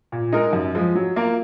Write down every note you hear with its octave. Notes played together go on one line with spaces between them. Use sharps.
A#2
G#3 D#4 A#4
F#2
F3 G#3
F#3
A#3 F4 A#4